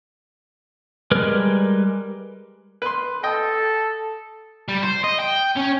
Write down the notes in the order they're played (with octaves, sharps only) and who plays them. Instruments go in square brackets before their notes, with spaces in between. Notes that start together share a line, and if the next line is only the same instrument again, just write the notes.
[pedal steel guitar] G3 G#3 A#4 B4 F6
[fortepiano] B4 C6
[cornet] A4 [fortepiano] D#5 G5
[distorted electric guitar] G3
C5
D#5
G5
C#4